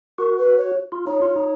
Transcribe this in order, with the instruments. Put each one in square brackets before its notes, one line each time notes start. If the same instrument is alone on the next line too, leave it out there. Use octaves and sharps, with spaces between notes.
[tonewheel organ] F#4 [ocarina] A#4
[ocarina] B4
C#5
[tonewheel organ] F4
[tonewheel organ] D#4 [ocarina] C#5
[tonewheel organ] F4
D#4